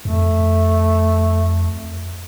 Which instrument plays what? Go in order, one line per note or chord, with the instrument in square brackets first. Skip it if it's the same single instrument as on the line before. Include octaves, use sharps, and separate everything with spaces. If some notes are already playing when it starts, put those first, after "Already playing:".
[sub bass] F2 [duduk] A3